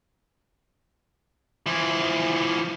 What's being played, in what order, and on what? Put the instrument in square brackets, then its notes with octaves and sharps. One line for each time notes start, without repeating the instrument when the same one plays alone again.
[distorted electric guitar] E3 F3